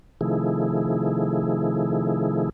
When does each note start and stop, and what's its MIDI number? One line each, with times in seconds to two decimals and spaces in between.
0.21 2.49 48
0.21 2.49 51
0.21 2.49 53
0.21 2.49 57
0.21 2.49 64
0.21 2.49 68